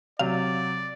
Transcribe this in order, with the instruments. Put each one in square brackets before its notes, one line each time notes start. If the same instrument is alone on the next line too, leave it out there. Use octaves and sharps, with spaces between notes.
[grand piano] C3 F#3 [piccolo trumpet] D5 [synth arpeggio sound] F5